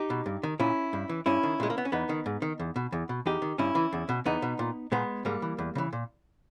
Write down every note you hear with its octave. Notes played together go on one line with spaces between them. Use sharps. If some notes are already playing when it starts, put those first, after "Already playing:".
Already playing: D#4 G4
B2
G2
D#3
A#2 C#4 E4
G2
E3
G2 C#4 E4
D#3
A#2 G#3
A#3
B3
C#4
E2 B3 D#4
D#3
G#2
D#3
E2
B2
E2
B2
E2 D#4 G4
D#3
G2 C#4 E4
E3
E2
B2
E2 B3 D#4
B2
A#2
A#2 G#3 B3
G#2 G3 A#3
E3
E2
C#3 E3
A#2